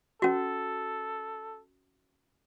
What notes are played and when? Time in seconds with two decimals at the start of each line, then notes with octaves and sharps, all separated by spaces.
0.22 C#4 F#4 A4